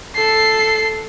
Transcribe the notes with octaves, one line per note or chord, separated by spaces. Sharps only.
A4 C7